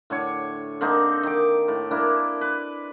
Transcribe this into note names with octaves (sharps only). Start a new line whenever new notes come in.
A2 D3 C#5
D3 A#3 C4 D#4
D#3 D6
A2
A#3 D4 E4
B4